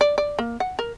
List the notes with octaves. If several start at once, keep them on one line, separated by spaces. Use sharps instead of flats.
D5
D5
A#3
F#5
A#4